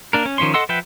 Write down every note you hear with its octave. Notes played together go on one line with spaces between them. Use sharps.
A#3 D4 A#4
C#4
D#3 F3 C#4 C#5 C6
A4 D#5 F#5 C6 E6
F3 B4 E5 F#5 G5